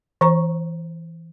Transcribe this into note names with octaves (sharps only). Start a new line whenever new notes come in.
E3 C5 A#5 C#6